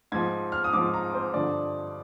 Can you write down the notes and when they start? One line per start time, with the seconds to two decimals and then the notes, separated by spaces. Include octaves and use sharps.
0.12 G#2 F3 G#6
0.52 F6
0.64 D#6
0.73 G#2 F3 D6
0.94 A#5
1.14 C5
1.34 G2 D3 F3 D5